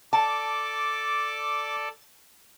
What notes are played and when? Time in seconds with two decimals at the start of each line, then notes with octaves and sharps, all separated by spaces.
0.13 A4 D5 A5 D6